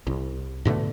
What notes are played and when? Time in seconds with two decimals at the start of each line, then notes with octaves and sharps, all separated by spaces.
0.07 C2
0.65 G#2 B2 D3 A3